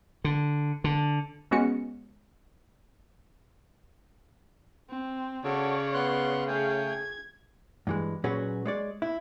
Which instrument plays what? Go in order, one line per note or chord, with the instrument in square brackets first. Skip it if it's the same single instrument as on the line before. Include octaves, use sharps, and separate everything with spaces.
[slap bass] D3
D3
[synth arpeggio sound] G#3 B3 C#4 F#4 C#7
[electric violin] C4
[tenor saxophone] C#3 [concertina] F#4 A4 [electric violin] C#5 D5
[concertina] B3 C6 F#6
[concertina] A3 C#5 G5 [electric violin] G#4 F5
[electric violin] G#6
[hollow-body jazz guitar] G2 E3 G#3
A#2 F#3 C#4 F#4 G#4 B4
G#3 C#5 D5
E4